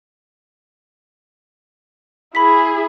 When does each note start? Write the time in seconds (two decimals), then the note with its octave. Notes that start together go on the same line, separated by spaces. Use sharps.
2.35 E4 G#4 B5 B6